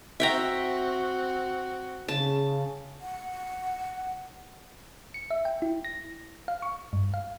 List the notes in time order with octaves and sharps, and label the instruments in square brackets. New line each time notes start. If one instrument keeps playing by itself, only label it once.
[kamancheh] C4 F#4 [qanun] E5 G5 A#5
[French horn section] C#3 [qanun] A5
[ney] F#5
[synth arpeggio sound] C#7
E5
G5
E4
A#6
F5
C#6
G2
F5